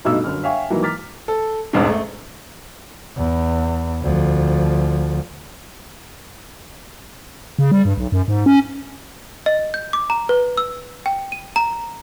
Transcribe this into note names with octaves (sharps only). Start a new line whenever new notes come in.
B1 G2 B2 A3 D#4 E6
G1 F#2 F6
C#5 E5 F5 G5 G#5 C#6
G#2 D#3 E3 F#3 A#3
A#5 D6 F6 A6 B6
A4
E1 A1 G#2
A3
E2
D2 F3
C#3
G3
G2
B1
F#2
G#2
C#4
D#5
G6
D6
A#5
B4
E6
G5
D#7
A#5